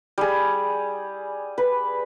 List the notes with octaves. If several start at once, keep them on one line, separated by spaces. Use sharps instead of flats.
G3 G#4
B4